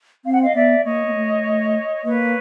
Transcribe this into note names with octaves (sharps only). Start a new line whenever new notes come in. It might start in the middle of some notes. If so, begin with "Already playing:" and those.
C4 F5
F#5
D#5 F5
B3 D5 E5
A#3 C#5 D#5
A#3
A3
A#3 B4 C#5